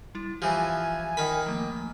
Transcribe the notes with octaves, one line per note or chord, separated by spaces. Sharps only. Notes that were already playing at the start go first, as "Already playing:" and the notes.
G3 E4
E3 F3 G4 G#5
D#3 A#4 B5
F3 A3 A#3